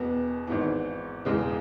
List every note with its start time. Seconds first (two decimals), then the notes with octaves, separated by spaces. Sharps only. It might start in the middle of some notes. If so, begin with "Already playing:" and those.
Already playing: E1 E2 B2 B3
0.47 G#1 G#2 E3 B3
1.25 E1 E2 C#3 E3 G#3